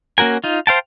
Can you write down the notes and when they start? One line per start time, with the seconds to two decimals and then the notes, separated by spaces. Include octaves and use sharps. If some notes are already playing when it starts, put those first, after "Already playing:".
0.18 A#3 C#4 F#4 A#4 G#5
0.44 D#4 F4
0.67 C5 F5 G5 A5